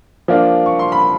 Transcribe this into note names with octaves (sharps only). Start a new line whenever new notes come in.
F3 A#3 D4 F4
C#6
C6
B5